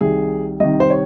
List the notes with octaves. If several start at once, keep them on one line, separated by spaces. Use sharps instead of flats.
C2 C3 D#3 G#4
C2 C3 D#3 D#5
C5
C#5